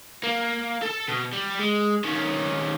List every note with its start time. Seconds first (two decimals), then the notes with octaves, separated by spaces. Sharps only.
0.23 A#3
0.83 A4 A5
1.09 B2
1.33 G3
1.59 G#3
2.04 D#3 C#4